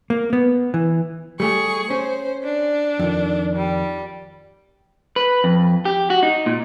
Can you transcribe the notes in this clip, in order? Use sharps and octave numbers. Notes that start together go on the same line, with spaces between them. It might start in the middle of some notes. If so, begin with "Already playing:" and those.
A#3
B3
E3
G3 A3 G4 G#4 C#6
C#4 C5
D4
F2 D#3
G3
B4
F2
G4
F#4
D#4
A#2